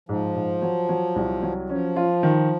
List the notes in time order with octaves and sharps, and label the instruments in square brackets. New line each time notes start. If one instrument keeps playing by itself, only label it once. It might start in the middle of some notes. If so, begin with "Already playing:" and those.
[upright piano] G#2 [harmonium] F3
[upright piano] G#2
F#3
F#3
C2
F#3
[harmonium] F3 [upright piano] C#4
[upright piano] F4
D#3